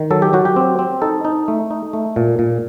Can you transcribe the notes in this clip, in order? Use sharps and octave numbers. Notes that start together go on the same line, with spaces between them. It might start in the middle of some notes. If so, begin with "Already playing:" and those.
Already playing: D#3
F#3 A4
G4
F#3 F#4
G4
C4
C4
D#4 A4
D#4
A3
D#4
A3
A#2
A#2